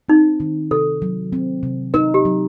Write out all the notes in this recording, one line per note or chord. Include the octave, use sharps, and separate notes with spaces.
C4 D#4
D#3
C3 A4
F#3
C4
C3
D#4 A#4
G4
F#3